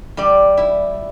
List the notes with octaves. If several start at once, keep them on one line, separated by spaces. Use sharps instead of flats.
G3 D5
E4